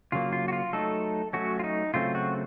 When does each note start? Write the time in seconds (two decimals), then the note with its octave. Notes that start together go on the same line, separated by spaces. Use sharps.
0.12 C#3 F#3 A#3 F4
0.33 F4
0.48 F#4
0.53 F4
0.73 F#3 A3 D#4 A4
1.33 F#3 A3 C#4 F#4
1.59 F4
1.64 D#4
1.94 C#3 F#3 A3 C4 F4
2.15 F#4